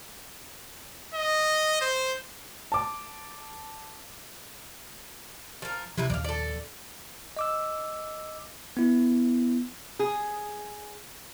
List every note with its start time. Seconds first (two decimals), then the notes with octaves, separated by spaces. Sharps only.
1.14 D#5
1.81 C5
2.72 A5 D6
5.62 F3 A#4
5.98 C3 F3 E4 B4
6.10 D#2 A#2 F3 D5 F5
6.24 A4 D5
7.37 D#5 D6 E6
8.77 B3 E4
9.99 G#4